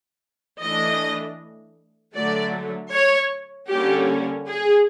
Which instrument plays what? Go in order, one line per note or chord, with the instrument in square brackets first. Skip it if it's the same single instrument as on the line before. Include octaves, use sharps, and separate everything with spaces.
[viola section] E3 A3 D4 D#5
D3 F#3 A3 D5
C#5
D3 G3 A#3 C#4 G4
G#4